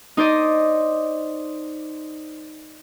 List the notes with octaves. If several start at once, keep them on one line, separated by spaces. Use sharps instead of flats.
D#4 C5 D5 D#5